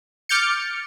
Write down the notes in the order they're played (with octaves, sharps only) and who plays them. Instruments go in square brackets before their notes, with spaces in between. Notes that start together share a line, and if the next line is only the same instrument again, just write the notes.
[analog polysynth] D6 F6 G6 A6 C#7